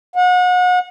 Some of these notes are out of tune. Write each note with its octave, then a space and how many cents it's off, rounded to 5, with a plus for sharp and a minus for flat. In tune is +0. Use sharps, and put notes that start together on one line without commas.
F#5 -35